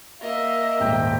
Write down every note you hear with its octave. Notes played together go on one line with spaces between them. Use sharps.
A#3 D#5 E5
D#1 G#2 G5